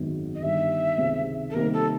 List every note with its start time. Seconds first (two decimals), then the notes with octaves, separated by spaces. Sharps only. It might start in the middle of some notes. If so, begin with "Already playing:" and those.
Already playing: G#1 F#2 D#3 G#3 B3
0.35 D#5
0.42 G1 G2 D#3 G3 E5
0.98 C#2 C3 D#3
1.50 A4
1.53 C3 D#3 G3 A#3 A#4
1.73 A4